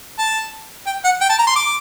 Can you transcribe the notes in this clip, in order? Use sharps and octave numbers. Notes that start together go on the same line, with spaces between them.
A5
G5
F#5
G5
A5
A#5
C6
D6